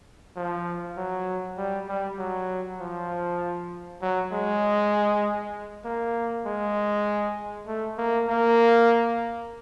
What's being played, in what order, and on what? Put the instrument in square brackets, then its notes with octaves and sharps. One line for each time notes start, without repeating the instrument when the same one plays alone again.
[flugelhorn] F3
F#3
G3
G3
F#3
F3
F#3
G#3
A#3
G#3
A3
A#3
A#3